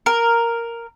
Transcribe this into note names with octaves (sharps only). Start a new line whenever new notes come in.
A#4